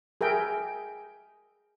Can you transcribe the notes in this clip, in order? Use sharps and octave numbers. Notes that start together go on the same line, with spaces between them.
G#4 A#4 E5 G5